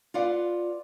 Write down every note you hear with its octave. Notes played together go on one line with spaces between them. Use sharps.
F4 B4 D5 F5 F#5